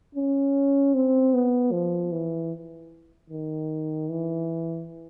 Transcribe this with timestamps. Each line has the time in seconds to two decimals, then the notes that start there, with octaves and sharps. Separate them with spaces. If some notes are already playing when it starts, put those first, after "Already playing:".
0.15 C#4
0.94 C4
1.34 B3
1.72 F3
2.12 E3
3.30 D#3
4.09 E3